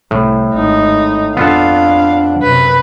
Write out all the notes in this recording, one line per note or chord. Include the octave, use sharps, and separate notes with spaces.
C2 A2
G#1 D#4
F2 B3 D4 F4 A4 F5
F#2 C3 B4